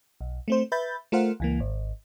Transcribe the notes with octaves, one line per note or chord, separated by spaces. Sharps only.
B1
A3 C4 C5
B4 E5 B5 G6 A6
A3 F4 A#4 C5 F5 F#5
C#2 E3 A#3
G#1